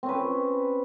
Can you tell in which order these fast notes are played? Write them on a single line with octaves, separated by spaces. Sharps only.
C4 C#4 B4